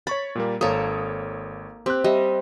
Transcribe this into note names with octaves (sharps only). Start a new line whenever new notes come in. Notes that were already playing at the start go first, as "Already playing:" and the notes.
C#5 B5 C#6 A6
A#2 G3 A#3
G#1 A#3 A4 C#5 D#6
C4 G4 F#6
G3 D#5 E5